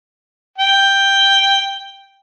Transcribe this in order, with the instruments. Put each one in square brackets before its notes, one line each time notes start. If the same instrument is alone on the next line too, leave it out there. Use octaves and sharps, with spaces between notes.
[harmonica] G5